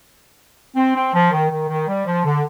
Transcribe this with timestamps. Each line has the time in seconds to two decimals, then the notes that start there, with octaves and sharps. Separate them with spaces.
0.75 C4
0.94 C4
1.13 F3
1.31 D#3
1.49 D#3
1.69 D#3
1.87 G3
2.05 F3
2.25 D3